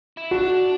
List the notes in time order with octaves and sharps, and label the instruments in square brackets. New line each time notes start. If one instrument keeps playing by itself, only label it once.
[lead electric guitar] E4
[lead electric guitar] D4 [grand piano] F#4